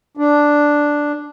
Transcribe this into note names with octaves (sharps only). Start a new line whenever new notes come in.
D4